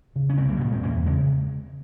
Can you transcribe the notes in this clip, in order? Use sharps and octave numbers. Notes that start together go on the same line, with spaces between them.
C#3
C#4
C2 G#3 C4
G3 A#3
A#2 F3
G#3 C4
E2 A#3 C#4
C#3 G#3 C4